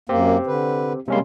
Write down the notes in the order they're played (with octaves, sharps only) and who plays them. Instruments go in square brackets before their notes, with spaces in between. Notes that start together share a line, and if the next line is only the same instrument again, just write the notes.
[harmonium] F#2 A#3 [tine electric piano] C4 G4
[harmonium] D3 B4
[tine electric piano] C3 C#4 C6 [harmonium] G3 G#3 A#3